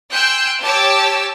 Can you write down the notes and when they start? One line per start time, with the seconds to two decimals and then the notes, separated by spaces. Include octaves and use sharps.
0.12 G5 G#5 C6 E6 F#6 G6
0.63 G4 C#5 A5 D6 E6